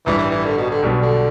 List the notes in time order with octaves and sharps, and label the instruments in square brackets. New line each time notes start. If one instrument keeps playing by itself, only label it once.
[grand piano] A1 G2 G3 [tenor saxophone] E3
[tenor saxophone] E3
E3
D3
B2
D3
[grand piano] B1 B2 G3 D4 B4
[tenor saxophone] D3